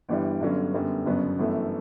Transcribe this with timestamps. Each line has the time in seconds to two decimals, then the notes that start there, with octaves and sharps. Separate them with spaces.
0.09 G1 G2 E3 G3
0.40 G1 G2 D3 F#3 C#4
0.74 F#2 D3 G3 B3
1.05 G1 F#2 C#3 F#3 B3
1.39 G1 F#2 E3 A3